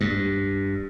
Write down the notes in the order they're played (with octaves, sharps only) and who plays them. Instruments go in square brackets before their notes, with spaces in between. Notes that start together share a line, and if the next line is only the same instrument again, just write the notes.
[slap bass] G2